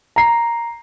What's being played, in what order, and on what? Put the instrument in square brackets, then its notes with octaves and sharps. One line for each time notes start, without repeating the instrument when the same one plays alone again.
[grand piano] A#5 C7